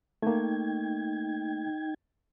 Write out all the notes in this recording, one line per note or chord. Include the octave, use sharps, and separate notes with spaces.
A3 A#3 D#4 G5 G#6